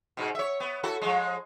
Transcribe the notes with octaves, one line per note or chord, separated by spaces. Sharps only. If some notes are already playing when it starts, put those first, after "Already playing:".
G#2 B2
C#5 E5
B3
E4 F#4 A4
F3 G#3